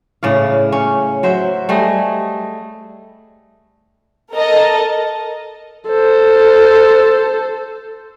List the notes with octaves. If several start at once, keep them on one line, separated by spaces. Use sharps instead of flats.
A2 C#3 D5 F5
C#4
F#3 C5 E5
G3 A3 G#4 D#5
A4 A#4 D#5 A5
A4 C5